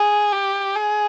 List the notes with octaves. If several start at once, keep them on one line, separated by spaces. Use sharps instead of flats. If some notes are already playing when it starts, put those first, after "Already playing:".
Already playing: G#4
G4
G#4